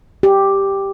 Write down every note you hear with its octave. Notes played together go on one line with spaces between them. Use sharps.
G4